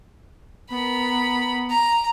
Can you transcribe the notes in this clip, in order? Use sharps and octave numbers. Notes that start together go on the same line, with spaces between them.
B3 A#4 B5
A#5